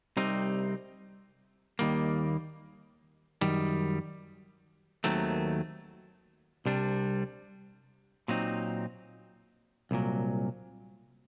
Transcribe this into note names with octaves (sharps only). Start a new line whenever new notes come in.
C2 C3 G3 C4 D#4
D#2 D#3 G3 A#3
F#2 D#3 G3
D#2 D#3 F#3 A3 C4
C2 C3 G3 D4
A#2 F#3 C4 D#4
C2 A#2 F#3